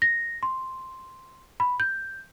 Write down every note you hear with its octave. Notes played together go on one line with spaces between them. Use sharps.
A#6
C6
B5
G6